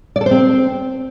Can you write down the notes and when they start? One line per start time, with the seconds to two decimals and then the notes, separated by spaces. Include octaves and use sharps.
0.16 D5
0.21 A4
0.26 C5
0.31 C4